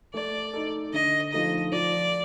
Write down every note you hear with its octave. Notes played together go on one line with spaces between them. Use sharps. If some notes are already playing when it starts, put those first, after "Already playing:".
A3 D5
D#4 A4
D3 D#5
F3 A3 D#4 D#5
F3 D5